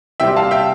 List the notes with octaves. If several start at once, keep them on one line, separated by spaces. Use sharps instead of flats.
C3 G3 C4 E5 G5
F5 A5
E5 G5